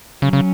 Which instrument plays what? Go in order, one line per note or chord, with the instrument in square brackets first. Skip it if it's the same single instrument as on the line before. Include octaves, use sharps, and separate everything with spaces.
[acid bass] C#3 [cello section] F#3 C#4
[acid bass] C#3